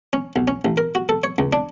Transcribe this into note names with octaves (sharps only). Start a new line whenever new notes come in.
C#4
B1
C#4
A1
A#4
F#4
A4
C#5
C#2
D4